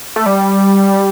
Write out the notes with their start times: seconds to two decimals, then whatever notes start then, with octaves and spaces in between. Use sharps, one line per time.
0.16 A3
0.26 G3